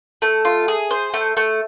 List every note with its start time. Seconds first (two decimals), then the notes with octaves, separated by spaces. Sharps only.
0.22 A3
0.45 F4
0.68 G#4
0.91 C5
1.14 A3
1.37 A3